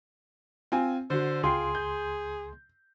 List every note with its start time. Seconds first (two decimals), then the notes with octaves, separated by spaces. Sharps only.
0.72 C4 F4 G#5
1.10 D3 F#4 C5
1.43 C#2 F4 G#4 G5 C6
1.75 G6